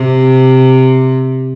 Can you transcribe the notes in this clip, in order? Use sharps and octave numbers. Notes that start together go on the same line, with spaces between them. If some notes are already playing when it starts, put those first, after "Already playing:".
Already playing: C3